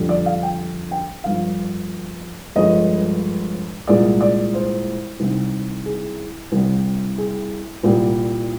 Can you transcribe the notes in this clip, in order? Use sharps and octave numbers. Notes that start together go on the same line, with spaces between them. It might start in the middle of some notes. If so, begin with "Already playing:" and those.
Already playing: F2 D3 G3
D5
F5
G5
G5
G1 G2 F3 F5
G1 G2 F3 G#3 D#5
C2 A#2 G#3 D5
D5
C5
C2 C3 D#3
G#4
C2 C3 G3
G#4
C2 A#2 G3